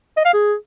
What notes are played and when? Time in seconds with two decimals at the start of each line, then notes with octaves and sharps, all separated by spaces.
0.17 D#5
0.25 F5
0.33 G#4